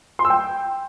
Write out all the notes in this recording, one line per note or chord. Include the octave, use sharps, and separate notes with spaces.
C6
E6
G5